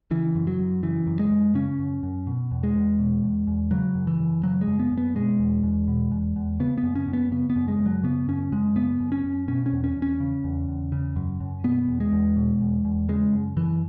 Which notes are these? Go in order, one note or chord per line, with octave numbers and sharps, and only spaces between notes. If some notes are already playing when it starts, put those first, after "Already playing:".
C#3 E3
F#2
F#3
F#2
C#3 E3
F#2
G#3
F#2
C#3 C#4
F#2
F#2
B2
E2
G#3
E2
B2
E2
E2
C#3 F#3
F#2
E3
F#2
C#3 F#3
G#3
F#2
B3
F#2
B3
B2 G#3
E2
E2
B2
E2
E2
C#3 B3
B3
F#2
C#4
F#2
B3
C#3 B3
B3
F#2
G#3
F#2
F#3
C#3 B3
F#2 C#4
F#2 G#3
C#3 B3
F#2
C#4
F#2
B2 C#4
C#4
E2
C#4
E2
C#4
C#3
E2
E2
C#3
F#2
F#2
B2 B3
E2
G#3
E2
B2
E2
E2
C#3 G#3
F#2
F#2 E3